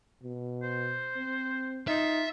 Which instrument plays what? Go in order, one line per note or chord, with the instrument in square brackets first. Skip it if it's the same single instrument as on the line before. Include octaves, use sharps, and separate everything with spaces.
[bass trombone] B2
[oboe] C5
[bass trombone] C4
[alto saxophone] D#4 [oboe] F4 [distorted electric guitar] E5